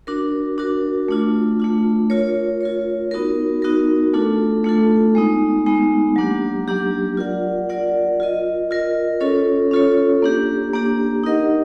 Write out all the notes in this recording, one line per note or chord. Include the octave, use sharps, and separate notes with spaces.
D4 F#4 A#4
D4 F#4 A#4
A3 D4 F4
A3 D4 F4
F4 A#4 C#5
F4 A#4 C#5
B3 D#4 F#4 A#4
B3 D#4 F#4 A#4
A3 D4 F4 A4
A3 D4 F4 A4
G#3 B3 D#4
G#3 B3 D#4
F#3 A#3 D4 G4
F#3 A#3 D4 G4
F4 A#4 D5 F#5
F4 A#4 D5 F#5
F4 A#4 D#5
F4 A#4 D#5
C#4 F4 A4 C#5
C#4 F4 A4 C#5
A#3 D4 G4
A#3 D4 G4
D#4 G4 A#4 D#5 F#5